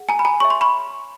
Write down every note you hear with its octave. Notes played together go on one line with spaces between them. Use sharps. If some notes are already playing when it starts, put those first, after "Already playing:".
Already playing: G#4 F#5
G#5 A#5
B5
G#5 A#5
G#4 C#5 E5 C#6
C6
B5 C#6